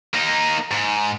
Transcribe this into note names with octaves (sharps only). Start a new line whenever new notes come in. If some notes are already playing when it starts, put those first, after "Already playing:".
A#3 D#4
G#2